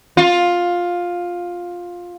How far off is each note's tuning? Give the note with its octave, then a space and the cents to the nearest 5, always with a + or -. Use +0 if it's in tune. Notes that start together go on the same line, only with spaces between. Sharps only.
F4 +10